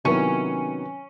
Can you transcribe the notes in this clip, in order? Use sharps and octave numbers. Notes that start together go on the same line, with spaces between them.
C3 D#3 F#3 B3 C#4 E4